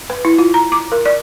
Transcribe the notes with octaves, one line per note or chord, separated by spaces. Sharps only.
B4
E4
F4
A#5
D6
A#4
D5